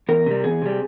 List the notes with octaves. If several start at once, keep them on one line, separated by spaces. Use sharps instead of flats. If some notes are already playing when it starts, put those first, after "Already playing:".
E2 A#4
C3 G3
E2 G#4
C3 G3